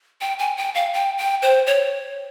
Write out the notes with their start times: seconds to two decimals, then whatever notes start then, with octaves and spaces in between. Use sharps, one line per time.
0.21 G5
0.39 G#5
0.57 G5
0.75 F5
0.93 G5
1.18 G5
1.42 C5
1.67 C#5